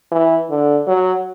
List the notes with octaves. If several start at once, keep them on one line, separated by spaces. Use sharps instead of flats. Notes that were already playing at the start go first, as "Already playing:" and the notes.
E3
D3
F#3